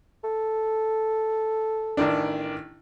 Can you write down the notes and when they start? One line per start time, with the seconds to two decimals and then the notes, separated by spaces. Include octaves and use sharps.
0.24 A4
1.97 A1 D#3 D4